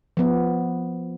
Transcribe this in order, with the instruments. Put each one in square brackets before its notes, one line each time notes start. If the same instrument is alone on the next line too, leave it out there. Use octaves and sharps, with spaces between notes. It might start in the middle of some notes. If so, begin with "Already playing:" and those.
[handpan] F3 B3